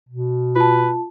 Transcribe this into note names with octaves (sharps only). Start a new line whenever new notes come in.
B2
F4 B4 A5